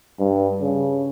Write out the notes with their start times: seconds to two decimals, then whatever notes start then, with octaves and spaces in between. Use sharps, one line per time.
0.19 G2
0.61 C#3